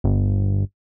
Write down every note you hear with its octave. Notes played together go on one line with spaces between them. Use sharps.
G1